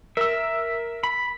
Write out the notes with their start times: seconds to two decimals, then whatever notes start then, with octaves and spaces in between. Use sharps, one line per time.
0.17 A#4 E5 E6
1.03 B5